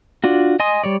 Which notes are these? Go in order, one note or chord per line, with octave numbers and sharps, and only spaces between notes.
D4 F4 F#4
D#5 G#5 C6 D#6
G3 C#5 D5